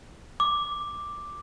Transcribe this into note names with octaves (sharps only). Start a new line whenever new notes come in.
D6